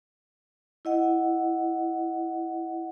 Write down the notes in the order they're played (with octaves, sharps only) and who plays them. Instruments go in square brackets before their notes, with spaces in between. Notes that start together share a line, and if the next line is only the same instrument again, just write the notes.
[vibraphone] E4 D#5 F#5